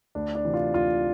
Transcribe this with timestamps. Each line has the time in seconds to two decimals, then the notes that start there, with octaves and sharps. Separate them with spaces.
0.15 D2 D4
0.35 D4
0.44 C3 E3
0.54 F4
0.74 D2 F4